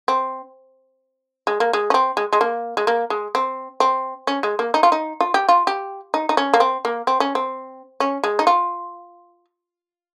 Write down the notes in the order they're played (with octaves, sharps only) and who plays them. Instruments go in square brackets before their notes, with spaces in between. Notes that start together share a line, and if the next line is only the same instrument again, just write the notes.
[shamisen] C4
G#3
A#3
G#3
C#4
C4
G#3
G#3
A#3
G#3
A#3
G#3
C4
C4
C#4
G#3
A#3
D#4
F4
D#4
F4
G4
F4
G4
D#4
D#4
C#4
A#3
C4
A#3
C4
C#4
C4
C#4
G#3
D#4
F4